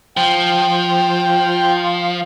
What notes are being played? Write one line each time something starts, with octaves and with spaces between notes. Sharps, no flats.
F3 G5